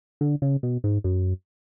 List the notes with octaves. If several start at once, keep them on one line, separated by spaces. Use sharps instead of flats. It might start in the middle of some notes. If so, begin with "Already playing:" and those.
D3
C#3
B2
G#2
F#2